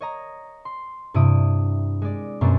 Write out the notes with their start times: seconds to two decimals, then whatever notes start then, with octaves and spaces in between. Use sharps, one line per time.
0.01 C#5 D#5 A#5
0.65 C6
1.14 G2 C3 E4 D#6 D7
2.02 G#3 D5
2.41 F#2 B2 G3 A#3 C4